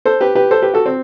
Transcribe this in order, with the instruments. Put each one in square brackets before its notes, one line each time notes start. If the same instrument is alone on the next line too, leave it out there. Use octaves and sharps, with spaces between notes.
[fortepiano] A4 C5
G4 B4
G4 B4
A4 C5
G4 B4
F#4 A4
C4